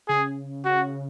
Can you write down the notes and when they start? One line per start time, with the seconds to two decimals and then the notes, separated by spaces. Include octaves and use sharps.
0.08 C#3 G#4
0.65 F#4